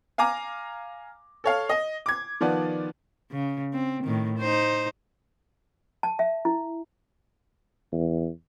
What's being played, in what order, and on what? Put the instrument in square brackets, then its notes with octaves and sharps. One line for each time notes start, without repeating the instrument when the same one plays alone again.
[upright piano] F5 G#5 A#5 D6
A4 C#5 F5
D#5
D6 G#6
D#3 F3 B3 D5
[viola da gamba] C#3
C4
A2 D#3
D#4 C5
[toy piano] A5
E5
E4
[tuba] E2